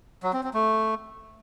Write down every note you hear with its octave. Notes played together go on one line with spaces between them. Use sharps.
F#3
C4
C4
A3